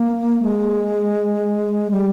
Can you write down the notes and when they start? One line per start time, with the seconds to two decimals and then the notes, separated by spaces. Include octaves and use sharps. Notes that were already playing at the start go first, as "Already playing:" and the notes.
Already playing: A#3
0.42 G#3
1.91 G3